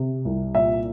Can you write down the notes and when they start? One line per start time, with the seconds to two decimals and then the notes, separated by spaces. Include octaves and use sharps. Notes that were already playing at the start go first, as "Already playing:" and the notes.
Already playing: C3
0.25 C2
0.55 A#2 E5